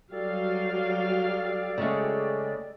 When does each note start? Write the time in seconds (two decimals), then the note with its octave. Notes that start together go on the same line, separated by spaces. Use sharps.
0.12 F#3 G3 G4 A4 D5 F5
1.78 C#3 G#3 A3